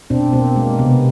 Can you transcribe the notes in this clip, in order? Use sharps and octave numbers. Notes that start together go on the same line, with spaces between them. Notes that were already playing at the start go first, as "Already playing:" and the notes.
B2 C4 D4
B2 A#3 C4
G#3 A#3
C3 B3